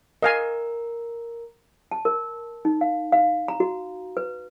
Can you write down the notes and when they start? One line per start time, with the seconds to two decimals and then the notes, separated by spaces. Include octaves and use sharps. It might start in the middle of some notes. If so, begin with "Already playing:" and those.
0.23 A#4 D#5 F5 G#5
1.92 A5
2.05 A#4
2.65 D#4
2.81 F5
3.12 F5
3.48 A#5
3.60 F#4
4.17 B4